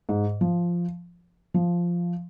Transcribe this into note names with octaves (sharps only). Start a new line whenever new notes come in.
G#2
F3
F3